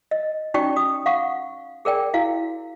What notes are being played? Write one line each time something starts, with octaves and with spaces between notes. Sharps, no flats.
D#5
C#4 D#4 F#4 D5 G5 C#6
F#4 D#6
F5 F#5 C#6
G#4 A#4 D5 G5
E4 F#4 F5